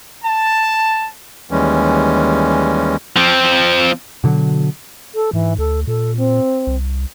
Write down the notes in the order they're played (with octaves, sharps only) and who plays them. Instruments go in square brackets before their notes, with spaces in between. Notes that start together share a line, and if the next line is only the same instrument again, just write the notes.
[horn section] A5
[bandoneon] D#2 E3 G3 G#3 C#4
[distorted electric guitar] F3 C4
[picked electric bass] B2 D3 F#3
[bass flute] A4
[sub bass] G#2 [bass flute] E3
[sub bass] D2 [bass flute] A4
[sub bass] A#2 [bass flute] A4
[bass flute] C4
[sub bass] C2